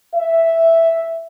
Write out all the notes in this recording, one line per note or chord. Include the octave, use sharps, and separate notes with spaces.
E5